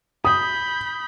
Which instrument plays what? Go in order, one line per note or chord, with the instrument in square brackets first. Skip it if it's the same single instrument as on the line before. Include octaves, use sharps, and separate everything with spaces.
[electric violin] B5 G6 [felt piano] D#6